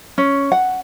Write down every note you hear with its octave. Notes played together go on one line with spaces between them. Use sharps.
C#4
F#5